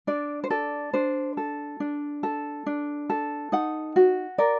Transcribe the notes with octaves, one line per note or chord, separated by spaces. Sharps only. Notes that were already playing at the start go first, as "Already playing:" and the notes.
D4 D5
C5
A4 D5
D4 C5
A4
D4
A4
D4
A4
D#4 F#5
F#4
A#4 D5